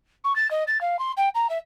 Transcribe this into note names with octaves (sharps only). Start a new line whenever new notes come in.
C#6
A6
D#5
A6
F5
C6
G5
A#5
E5